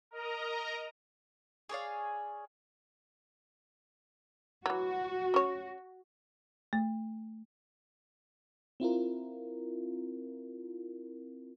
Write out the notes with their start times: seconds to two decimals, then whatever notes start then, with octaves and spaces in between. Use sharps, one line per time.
0.11 A#4 D#5 A#5
1.69 G#4 C#5 D5 F5
4.66 E3 F#3 F#4
5.34 C#4 C#5
6.73 A3
8.80 C4 E4 F4 A#4